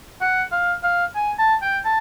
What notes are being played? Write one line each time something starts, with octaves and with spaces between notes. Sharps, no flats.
F#5
F5
F5
G#5
A5
G5
A5